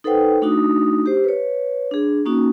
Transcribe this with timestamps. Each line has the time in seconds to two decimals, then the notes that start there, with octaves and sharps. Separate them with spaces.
0.04 D#4 A4 B4 C5 F#5 G5
0.42 A3 D4 D#4 F#4 D#6
1.06 G4 C5
1.24 B4 C#5
1.91 D4 G#4
2.25 A#3 C#4 D#4 F#4